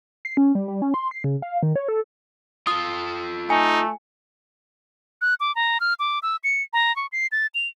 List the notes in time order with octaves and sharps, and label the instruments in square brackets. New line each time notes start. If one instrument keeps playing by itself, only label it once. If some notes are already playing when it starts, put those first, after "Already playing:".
[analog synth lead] C7
C#4
G3
G3
C#4
C6
C7
C#3
F5
D#3
C#5
A4
[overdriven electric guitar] F4 A4 [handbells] D#6
[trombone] A3 [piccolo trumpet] D#4 [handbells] G#5
[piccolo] F#6
D6
A#5
F6
D6
E6
C#7
A#5
C#6
C7
A6
F7